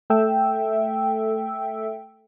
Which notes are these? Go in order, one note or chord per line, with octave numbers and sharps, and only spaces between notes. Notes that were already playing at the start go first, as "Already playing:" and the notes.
A3 A4 E5 G5 E6